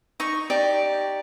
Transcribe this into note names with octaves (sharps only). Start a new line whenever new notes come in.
D#4 C#6
D#4 G4 D5